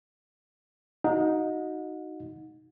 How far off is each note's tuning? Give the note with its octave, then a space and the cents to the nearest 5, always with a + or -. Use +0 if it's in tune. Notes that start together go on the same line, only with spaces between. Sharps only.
D#4 +5 F#4 +0 F#5 -40